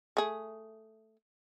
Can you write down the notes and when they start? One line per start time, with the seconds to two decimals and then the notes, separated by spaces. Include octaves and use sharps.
0.17 A3 G#4